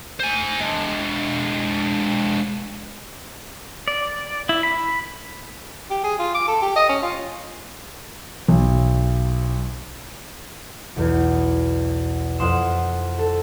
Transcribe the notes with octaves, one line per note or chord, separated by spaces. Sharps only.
C5 G#5
G#3 D4
D5
E4
B5
G4
G#4
F4
D6
A4
G4
D#5
C#4
F4
B1
B1 E2
F2 F4 F#5 C6 D#6 E7
A4